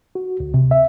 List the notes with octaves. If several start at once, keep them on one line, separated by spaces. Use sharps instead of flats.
F#4
D2
C3
E5